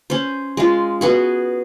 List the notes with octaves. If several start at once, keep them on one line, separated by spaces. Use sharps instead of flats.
C#4 C5
G#3 F4
B3 F#4 G#4